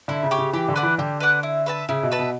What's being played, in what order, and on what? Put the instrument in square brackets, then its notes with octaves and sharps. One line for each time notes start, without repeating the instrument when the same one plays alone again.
[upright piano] D3 [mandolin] E4
[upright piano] C#3
[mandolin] G4 C#5
[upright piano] C#3
[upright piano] E3 [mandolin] G4
[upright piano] D3
[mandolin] B4 D5 F#5
[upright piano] E3
[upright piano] D3 [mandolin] G4
[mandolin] B4 D5 F#5
E4
B4 E5 A5
[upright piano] C#3 [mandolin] E4
[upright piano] B2
[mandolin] B4 E5 A5
[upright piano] B2